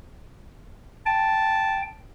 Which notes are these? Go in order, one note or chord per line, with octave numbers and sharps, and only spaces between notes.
G5 A5